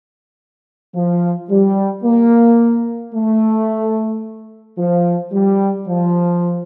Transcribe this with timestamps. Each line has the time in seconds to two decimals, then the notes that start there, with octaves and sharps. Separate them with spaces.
0.95 F3
1.50 G3
2.04 A#3
3.14 A3
4.78 F3
5.33 G3
5.87 F3